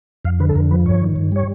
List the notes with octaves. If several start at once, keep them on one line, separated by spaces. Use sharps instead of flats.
F2 F5
D3 B4
A4
F2 A#4
F3 B4
G2 C#5
D#3
G2
G3 C#5